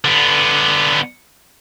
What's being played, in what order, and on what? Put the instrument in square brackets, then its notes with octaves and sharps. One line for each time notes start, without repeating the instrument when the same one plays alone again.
[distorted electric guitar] D3 B3